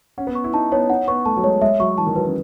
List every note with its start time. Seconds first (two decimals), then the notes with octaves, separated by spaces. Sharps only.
0.18 C#4 F#5
0.27 B3
0.35 C#6
0.44 E4
0.53 D#4 A5
0.72 B3 C#5
0.90 D#4 F#5
1.08 B3 C#6
1.26 A3 A5
1.36 F#3
1.43 G#3 C#5
1.62 G#3 E5
1.80 F#3 C#6
1.98 E3 A5
2.06 D#3
2.16 F#3 B4
2.25 C#4